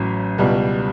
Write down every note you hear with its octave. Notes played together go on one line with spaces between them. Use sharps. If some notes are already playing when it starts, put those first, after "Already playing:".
Already playing: A1 A2 F#3 C#4
C#2 B2 G3